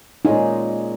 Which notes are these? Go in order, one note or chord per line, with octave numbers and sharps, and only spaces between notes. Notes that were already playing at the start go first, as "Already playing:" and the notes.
A#2 G#3 C#4 D#4 F4 G#4